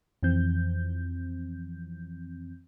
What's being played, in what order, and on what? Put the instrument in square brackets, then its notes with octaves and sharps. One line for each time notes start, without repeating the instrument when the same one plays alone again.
[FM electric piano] F2 E3 F3 C4 G6